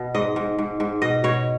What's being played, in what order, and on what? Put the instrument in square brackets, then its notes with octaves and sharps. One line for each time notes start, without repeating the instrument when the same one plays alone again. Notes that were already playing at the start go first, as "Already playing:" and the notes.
Already playing: [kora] B2 B3
G#2 D#5
G#2
G#2
G#2
B2 D#5
B2 C#5